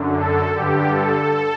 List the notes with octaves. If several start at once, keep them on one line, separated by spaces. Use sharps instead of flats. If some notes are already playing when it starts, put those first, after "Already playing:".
Already playing: F#2 D3
A4
G2 D3 G4
A4